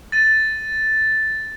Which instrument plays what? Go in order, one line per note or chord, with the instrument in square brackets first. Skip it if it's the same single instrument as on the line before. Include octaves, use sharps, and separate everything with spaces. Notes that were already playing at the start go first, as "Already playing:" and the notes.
[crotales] A6 D#7